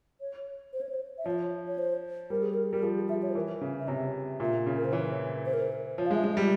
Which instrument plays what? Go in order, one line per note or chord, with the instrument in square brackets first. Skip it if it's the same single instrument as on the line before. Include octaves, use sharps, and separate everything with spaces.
[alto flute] C#5
C5
C#5
C5
E5
[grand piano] F3 [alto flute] C#5
[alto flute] C#5
C5
[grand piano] G3 [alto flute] A#4
[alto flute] G#4
A#4
[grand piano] G3 [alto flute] A#4
[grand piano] F3 [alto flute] G#4
[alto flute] G#4
[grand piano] F3 [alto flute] E5
[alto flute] C#5
C5
[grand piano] E3 [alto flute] A#4
[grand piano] C#3
[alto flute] E5
[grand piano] C3 [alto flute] C#5
[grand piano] A#2 [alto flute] E5
[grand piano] C#3
[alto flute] A#4
C5
[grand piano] E3 [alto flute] C#5
[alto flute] C5
A#4
C5
[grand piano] F3 [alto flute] C#5
[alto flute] F5
[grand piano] G#3
[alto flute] E5
[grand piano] G#3
[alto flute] E5
[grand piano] G3